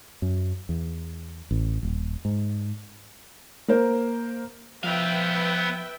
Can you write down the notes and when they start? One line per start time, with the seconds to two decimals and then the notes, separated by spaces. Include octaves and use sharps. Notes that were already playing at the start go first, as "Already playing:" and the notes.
0.22 F#2
0.69 E2
1.51 A1
1.83 D#1
2.25 G#2
3.68 A#3 A#4 C5
4.84 F3 B3 B4 E5 F5 G5